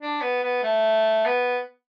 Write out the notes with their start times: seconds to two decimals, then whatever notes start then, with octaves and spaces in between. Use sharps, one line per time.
0.02 D4
0.22 B3
0.43 B3
0.63 A3
1.25 B3